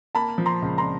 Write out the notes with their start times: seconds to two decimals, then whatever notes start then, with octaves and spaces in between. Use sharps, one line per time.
0.15 A#3 A5 B5
0.38 F3
0.46 A#5 C6
0.62 C#2
0.78 A#5 C6